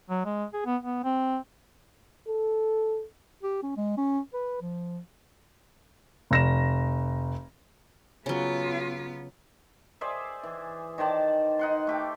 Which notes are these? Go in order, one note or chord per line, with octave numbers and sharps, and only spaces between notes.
F#3
G#3
G#4
B3
B3
C4
A4
G4
C#4
G#3
C#4
B4
F3
F1 A#6 E7
C#3 F#3 B3 F4
G#4 C5 D5 E5
E3
D#3 C5 D5 A5
D#4 F#5 C6
A3 G4 D6